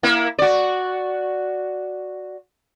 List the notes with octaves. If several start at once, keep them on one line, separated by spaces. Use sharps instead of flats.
A#3 E4
F#4 D5